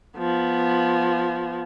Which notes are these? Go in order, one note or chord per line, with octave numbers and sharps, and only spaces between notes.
F3 B3